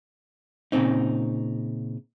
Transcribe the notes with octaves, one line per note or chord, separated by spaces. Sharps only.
A#2 C#3 C4 D#4